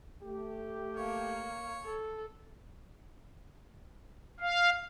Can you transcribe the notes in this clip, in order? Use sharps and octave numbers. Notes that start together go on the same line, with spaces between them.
A3 G4
A#3 C#5
A4
F5